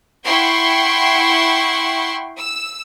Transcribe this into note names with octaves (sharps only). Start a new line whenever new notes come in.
E4 F#5 G5 C6 C#6
E6